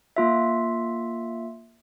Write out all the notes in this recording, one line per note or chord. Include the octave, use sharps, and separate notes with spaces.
A#3 F4 E5